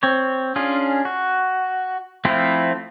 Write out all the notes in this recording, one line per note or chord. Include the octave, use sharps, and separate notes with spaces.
C4 C#5
C#4 D4 F4 G#4
F#4
F3 A3 C4 E4 F4